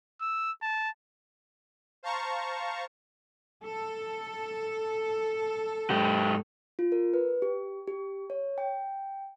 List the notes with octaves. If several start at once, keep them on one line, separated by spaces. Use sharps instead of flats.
E6
A5
C5 F5 A5 A#5 C#6
A4
G#2 G4
F4
A#4
B4
G4
G4
C#5
G5